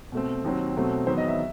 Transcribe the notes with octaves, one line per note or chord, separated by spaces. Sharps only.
B2 A3 C4
D#2 D#3 F#3 C4
B2 F#3 A3 C4
E2 D#3 F#3 B3 C5
D#5
E5